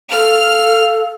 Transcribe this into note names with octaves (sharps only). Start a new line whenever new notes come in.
A4 F5 F6